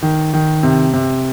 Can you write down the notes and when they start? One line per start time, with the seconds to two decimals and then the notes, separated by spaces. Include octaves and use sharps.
0.02 D#3
0.33 D#3
0.63 C3
0.93 C3